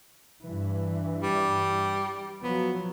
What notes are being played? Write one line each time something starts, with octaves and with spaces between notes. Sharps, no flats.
G2 E3
G3
F3 F#3 B3